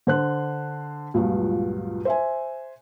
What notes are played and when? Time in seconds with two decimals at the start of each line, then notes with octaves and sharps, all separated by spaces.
0.07 D3 C5 F#6
1.14 C#2 G2 A#2 F#3
2.05 C5 E5 G#5